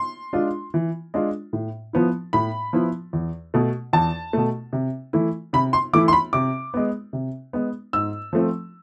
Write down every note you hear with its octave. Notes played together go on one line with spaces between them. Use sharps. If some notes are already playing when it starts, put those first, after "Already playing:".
Already playing: C6
G#3 D4 F4
E3
G#3 D4 F4
A2
F3 B3 E4
A2 B5
F3 B3 E4
E2
B2 A3
E2 A5
B2 A3
C3
E3 A3 E4
C3 B5
C6
E3 A3 E4 D6
C6
B5
C3 D6
G#3 B3
C3
G#3 B3
G#2 E6
F3 A3 C4